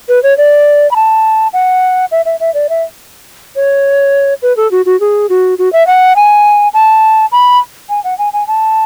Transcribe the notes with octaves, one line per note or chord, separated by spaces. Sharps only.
B4
C#5
D5
B5
A5
F#5
E5
E5
E5
D5
E5
C#5
B4
A4
F#4
F#4
G#4
F#4
F#4
E5
F#5
G#5
A5
B5
G#5
F#5
G#5
G#5
A5